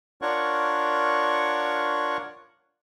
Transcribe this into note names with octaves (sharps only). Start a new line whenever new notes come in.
D4 F4 A#4 C#5 F#5 C#6